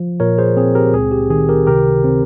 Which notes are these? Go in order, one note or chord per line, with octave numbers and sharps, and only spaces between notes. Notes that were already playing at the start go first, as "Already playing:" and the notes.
Already playing: F3
A#2 A#4 C#5
G#4 C5
C4 G#4
G4 A#4
C#2 G#4
G4
D#3 G#4
G4 A#4
C3 G4 A#4
C4